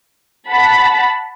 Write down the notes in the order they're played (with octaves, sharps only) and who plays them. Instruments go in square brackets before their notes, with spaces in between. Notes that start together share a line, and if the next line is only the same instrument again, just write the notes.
[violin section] F#5 A5 B5